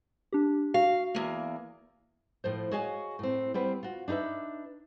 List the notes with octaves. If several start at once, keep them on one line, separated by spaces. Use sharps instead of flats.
D4 G4
F#4 F5
E2 A#3
A2 F3 C5
F#4 G#4 C#5 D#5 F5 G#5
A2 C4
G3 B3 C4 B4
F4 F#4
D4 D#4 G4 B4 E5